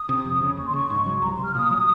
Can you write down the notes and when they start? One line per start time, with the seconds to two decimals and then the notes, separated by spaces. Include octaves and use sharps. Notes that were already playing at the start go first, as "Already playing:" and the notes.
Already playing: D#6
0.09 C3
0.25 F2
0.42 C#3
0.57 D#2 C#6
0.66 C6
0.74 C#3 C#6
0.90 G#2
1.06 F#3
1.22 C2 A#5
1.33 C6
1.39 C3
1.44 F6
1.55 A#2 D#6
1.70 F#3